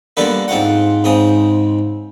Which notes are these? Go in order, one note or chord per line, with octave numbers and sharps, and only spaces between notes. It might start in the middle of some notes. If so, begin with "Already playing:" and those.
D3 G3 A#3 B3 A4 B4
G#2 C4 F4 F#5
G#2 C#3 C4 D#6